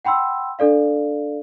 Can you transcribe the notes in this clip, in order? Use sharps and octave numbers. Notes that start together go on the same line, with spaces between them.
F#5 G5 B5 C6 E6
D4 A4 D5 F5